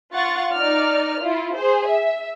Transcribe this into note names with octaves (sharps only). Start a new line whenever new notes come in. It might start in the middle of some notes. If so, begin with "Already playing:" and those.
F4 F#5 C#6 A6
D#4 D5 F6
E4 F4
G#4 C5
E5